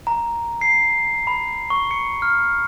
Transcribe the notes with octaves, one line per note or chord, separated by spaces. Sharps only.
A#5
C7
B5
C#6
C#7
F6